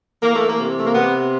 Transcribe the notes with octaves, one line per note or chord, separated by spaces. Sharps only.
E3 A#3
A3
A#3
C3
A3
A#3
C3 B3